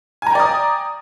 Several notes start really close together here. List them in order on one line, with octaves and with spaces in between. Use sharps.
G#5 A#5 G5 D5 D#6